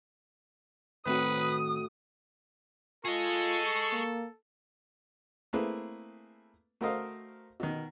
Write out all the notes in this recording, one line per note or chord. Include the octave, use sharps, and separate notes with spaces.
A2 D#3 C4 F#4 B4 D#6
F4 G#4 A4 D#5 C#6
A#3
A3 A#3 C4 E4 G#4 B4
A3 F#4 A#4 C5 D#5 F5
B2 D#3